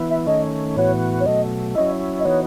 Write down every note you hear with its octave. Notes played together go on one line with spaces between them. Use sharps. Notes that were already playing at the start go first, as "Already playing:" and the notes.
Already playing: E3 B3 E4
E5
D#3 A3 C#4 D#5
A2 E3 B3 F#4 C#5
C#5
B2 F#3 A3 D#5
F#3 C#4 E4 D#5
D#5
E3 B3 D#4 F#4 C#5